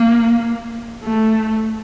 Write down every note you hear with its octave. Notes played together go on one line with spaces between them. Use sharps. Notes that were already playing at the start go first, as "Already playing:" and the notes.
Already playing: A#3
A3